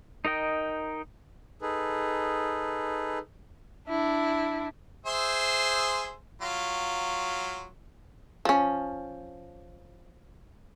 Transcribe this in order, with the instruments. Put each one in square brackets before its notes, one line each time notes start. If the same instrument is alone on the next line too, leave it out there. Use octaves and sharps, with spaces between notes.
[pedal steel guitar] D#4 A#4 D#5 G5
[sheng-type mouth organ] D#4 G#4 A4 B4
[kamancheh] D4 E4
[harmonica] G#4 C5 E5
F#3 F4
[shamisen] F3 C#4